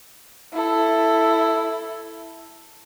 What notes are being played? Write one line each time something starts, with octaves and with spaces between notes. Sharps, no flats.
E4 A4